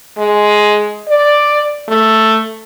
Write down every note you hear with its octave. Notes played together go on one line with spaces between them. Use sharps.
G#3
D5
A3